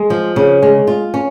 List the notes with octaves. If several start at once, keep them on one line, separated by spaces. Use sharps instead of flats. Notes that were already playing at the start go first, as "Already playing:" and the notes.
Already playing: G#3
F3
C#3
G#3
F4
C#4